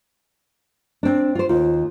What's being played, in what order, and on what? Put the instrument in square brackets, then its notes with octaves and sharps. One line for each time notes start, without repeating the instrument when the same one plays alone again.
[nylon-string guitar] C4 D4
F4 C5
[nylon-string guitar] D#2 [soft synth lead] F4